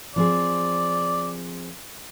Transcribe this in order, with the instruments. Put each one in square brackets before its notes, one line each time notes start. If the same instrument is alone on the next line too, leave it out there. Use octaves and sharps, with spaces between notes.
[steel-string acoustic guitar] F3 C4 G#4 [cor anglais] D5